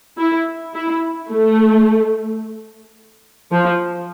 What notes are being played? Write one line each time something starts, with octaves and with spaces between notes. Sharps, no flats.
E4
E4
A3
F3